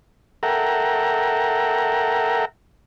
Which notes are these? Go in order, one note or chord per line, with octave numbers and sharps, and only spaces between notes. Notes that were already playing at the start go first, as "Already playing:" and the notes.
A4 A#4 E5 F#5 G5 A#5